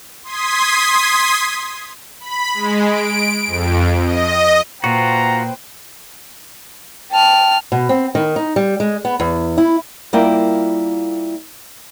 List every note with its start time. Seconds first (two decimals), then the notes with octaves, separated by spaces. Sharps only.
0.23 C6 D#6 G#6 B6
2.20 B5
2.54 G#3
2.86 D7
3.47 F2
4.05 D#5
4.84 A#2 F4 F#4 B4 C5 G5 A#5
7.11 G5 A5 F6
7.72 B2
7.89 C4
8.15 D#3
8.36 D#4
8.56 G3
8.80 G#3
9.05 B3
9.20 E2
9.58 E4
10.13 G3 A#3 E4 F4 A#4 G5